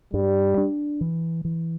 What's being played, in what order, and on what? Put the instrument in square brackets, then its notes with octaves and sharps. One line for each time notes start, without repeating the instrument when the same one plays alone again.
[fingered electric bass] G2 [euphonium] G3
[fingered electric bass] D4
E3
E3